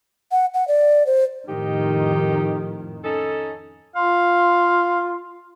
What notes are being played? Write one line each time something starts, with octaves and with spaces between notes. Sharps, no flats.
F#5
F#5
D5
C5
F2 A2 D#3 D#4 G4
C#4 D#4 A4
F4 F5 C6